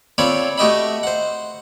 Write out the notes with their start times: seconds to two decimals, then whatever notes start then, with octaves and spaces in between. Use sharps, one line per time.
0.18 C4 F4 A4 C#5 D5 B5
0.58 A3 F#4 G4 D#5 E5 B5
1.03 C5 F#5